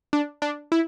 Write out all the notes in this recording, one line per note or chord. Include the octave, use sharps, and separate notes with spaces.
D4
D4
E4